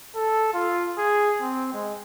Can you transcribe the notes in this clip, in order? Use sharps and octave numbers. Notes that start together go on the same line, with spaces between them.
A4
F4
G#4
C4
G#3